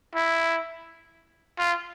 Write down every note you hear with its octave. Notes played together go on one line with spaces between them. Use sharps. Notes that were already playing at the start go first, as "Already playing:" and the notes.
E4
F4